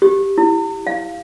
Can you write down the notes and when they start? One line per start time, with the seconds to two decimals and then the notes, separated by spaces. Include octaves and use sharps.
0.02 G4
0.38 E4
0.87 F5